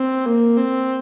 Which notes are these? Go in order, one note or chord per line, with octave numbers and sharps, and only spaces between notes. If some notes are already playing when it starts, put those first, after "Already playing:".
Already playing: C4
A#3
C4